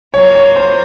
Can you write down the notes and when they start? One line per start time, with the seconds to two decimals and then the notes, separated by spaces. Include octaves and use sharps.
0.14 F#3 A#3 F4 C#5
0.35 C#5
0.56 C5